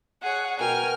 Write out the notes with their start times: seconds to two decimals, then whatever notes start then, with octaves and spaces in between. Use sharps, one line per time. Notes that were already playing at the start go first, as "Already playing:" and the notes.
0.22 G#4 C#5 F#5
0.59 B2 F#4 A#4 G5 G#5 F6